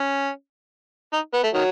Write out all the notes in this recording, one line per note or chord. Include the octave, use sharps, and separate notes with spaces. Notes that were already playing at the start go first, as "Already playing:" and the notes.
Already playing: C#4
D#4
B3
A3
D#3 F#3